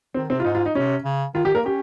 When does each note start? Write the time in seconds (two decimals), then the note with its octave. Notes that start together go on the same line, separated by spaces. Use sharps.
0.14 D#3 C4
0.30 C3 C4
0.40 F4
0.45 G#2 D#4
0.55 F4
0.66 D#4
0.75 C3 C#4
1.05 C#3
1.35 D#3 F4
1.45 D#3 G4
1.55 A#3 A#4
1.65 C#4 G4